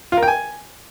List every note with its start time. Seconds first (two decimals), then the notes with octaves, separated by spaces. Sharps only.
0.12 F4
0.17 A#4
0.23 G5
0.28 G#5